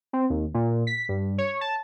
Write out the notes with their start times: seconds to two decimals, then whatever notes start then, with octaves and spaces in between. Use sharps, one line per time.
0.13 C4
0.30 D#2
0.54 A#2
0.87 B6
1.09 G2
1.38 C#5
1.61 A5